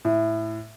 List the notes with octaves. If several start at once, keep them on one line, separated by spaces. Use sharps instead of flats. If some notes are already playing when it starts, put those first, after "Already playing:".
A2